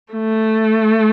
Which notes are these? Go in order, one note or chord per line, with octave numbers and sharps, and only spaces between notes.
A3